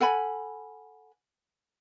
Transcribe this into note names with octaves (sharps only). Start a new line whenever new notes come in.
A4 F#5 G#5 B5